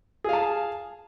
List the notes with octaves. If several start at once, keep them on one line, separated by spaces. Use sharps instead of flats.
G#4 F5 A5